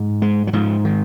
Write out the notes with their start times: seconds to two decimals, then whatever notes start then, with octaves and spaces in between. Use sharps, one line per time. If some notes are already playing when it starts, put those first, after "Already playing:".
Already playing: G#2
0.22 G#3
0.47 F#3
0.53 G#2 F3
0.85 D#3